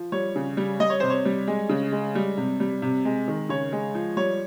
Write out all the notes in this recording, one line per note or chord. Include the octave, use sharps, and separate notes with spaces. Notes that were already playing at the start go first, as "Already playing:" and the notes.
Already playing: F3
G3 C#5
C#3
G3
G3 D#5
C#5
C3 C5
C#5
G3
G#3
C#3
G#3
G3
C3
G3
C3
G#3
D#3
C#3 C#5
G#3
F3
G3 C#5